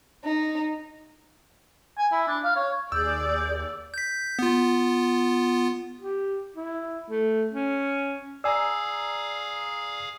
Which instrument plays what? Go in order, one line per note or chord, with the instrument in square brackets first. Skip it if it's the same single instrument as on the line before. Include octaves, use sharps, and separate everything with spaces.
[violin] D#4
[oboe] G#5
E4
D4
F5
C#5
[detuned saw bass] D#2 [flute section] G#4 G6 [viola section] D5 [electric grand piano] E6
[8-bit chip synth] G6 B6
B3 F4
[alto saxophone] G4
E4
A3
C#4
[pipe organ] G#4 F5 [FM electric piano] D5 A#5 [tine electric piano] G#5 E6